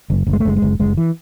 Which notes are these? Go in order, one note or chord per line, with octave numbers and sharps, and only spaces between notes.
F#1
F#1
G#3
A3
F#1 G#3
G#3
F#1
F#1 G#3
E3